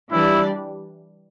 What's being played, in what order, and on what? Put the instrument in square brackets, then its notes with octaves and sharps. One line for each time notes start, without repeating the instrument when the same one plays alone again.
[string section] E3 G3 D4 G4 D5 [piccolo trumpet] E4